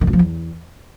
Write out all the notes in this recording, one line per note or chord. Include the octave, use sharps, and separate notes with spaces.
D#3
G2
F3
E2